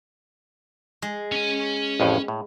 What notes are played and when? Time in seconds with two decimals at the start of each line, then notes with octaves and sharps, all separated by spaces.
1.02 G#3
1.32 C#4 G#5
2.00 A1 F2 A2
2.28 A2